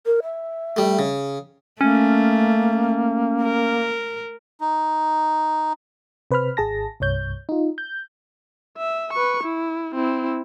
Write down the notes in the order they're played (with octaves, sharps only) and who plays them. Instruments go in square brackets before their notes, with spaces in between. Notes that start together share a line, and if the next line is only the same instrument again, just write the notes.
[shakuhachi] A#4
E5
[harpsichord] G3 A3
C#3
[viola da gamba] A3 [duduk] A#3 [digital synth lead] C#4
[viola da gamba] A#4
[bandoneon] D#4
[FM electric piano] C3 B4 C5 B5 F6
G#1 G#4 A5 A#6
C2 G2 C#5 G6
D#4 F4
G6
[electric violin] E5
B4 C#6
E4
C4 E4